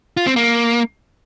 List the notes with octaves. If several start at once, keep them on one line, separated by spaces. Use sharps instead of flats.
F4
C4
A#3